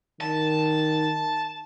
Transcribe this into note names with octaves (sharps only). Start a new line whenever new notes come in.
D#3 A5